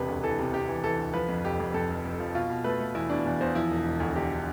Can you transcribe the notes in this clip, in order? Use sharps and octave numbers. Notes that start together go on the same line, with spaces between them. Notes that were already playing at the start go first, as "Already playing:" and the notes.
Already playing: E1 C3 B4
D2
E3 A4
C3
C3 G4
E3
E3 A4
D2
F3 B4
F2
F1 G4
F2
F2 A4
F1
F2
F3
B2 F4
B2
A3 B4
A3
E2 E4
B2 D4
E2
E2 C5
F3 E4
E1
E1
D2
D3 G4